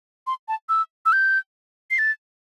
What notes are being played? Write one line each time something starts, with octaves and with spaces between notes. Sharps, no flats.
C6
A5
E6
E6
G6
C7
A6